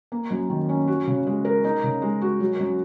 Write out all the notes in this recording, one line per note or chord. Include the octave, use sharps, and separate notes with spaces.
A#3
F#2
D#3
C#4
F#4
C#3
G#3
A#4
D#4
C#3
G#3
F#4
F#3
F#2